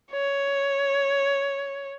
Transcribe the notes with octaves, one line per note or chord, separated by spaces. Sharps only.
C#5